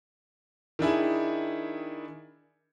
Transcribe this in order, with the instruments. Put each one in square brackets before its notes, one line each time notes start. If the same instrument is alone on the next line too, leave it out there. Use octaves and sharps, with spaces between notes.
[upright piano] D#3 D4 E4 G#4